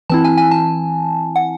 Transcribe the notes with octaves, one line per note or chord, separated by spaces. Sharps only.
E3 C4 E4 A5
G#5
G#5
A5
F#5